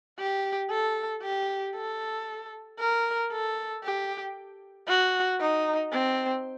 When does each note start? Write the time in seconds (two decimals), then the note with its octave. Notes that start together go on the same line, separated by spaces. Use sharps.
0.19 G4
0.70 A4
1.22 G4
1.76 A4
2.79 A#4
3.32 A4
3.83 G4
4.88 F#4
5.40 D#4
5.92 C4